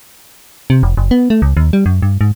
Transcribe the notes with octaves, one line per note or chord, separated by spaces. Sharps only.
C3
F1
F#1
B3
A3
C#2
D#2
G3
F#2
G2
G#2